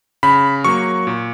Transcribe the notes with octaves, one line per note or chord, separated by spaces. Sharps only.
C#3 B5
F#3 A#3 C#6
A#2